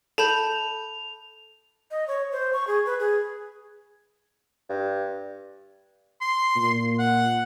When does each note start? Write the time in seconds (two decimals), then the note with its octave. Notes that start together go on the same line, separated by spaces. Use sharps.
0.18 A4 A5 B5 G6 F7
1.91 D#5
2.07 C#5
2.32 C5
2.53 C#6
2.67 G#4
2.86 B4
3.00 G#4
4.69 G2
6.22 C6
6.56 A#2
6.99 F#5